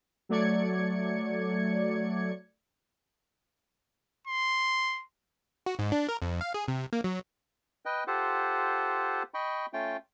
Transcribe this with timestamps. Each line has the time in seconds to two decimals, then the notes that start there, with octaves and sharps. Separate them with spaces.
0.29 F#3 A3 D5 G#6 C#7
4.27 C6
5.66 F#4
5.79 G#2
5.92 D4
6.09 A#4
6.22 F2
6.41 F5
6.54 G#4
6.68 C3
6.93 A#3
7.04 F#3
7.85 B4 D#5 G5
8.07 F4 G4 A4 C5 F#5
9.34 D#5 G5 B5 C#6
9.73 A3 C#4 F4 G5